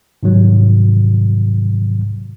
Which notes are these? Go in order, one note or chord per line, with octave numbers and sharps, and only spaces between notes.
G#2 C3 D#3 F#3